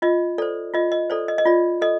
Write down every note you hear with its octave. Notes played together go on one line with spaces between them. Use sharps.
F4 D#5
A4 C5 D5
F4 D#5
D#5
A4 C5 D5
D#5
D#5
F4 D5
A4 D#5